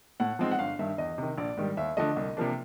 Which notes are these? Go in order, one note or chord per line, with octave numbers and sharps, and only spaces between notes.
A2 F#5
F3 G#3 C4 D#4
F#5
G1 F5
G2 D#3 E5
E2 D#5
C3 D#3
A#1 D5
G#2 D#3 G3
D#2 E5
D3 F3 A3 D#5
C2
C3 F3 A#3 D4